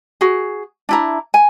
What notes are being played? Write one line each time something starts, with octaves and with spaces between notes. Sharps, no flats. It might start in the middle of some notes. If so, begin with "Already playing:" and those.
F#4 G#4
D4 E4 A#5
G#5